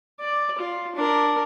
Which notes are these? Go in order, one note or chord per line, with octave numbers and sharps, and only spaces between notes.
D5
F4
D4 A#4